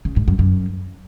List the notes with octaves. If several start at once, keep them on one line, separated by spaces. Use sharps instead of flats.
C#3
G#2
F#2
F#2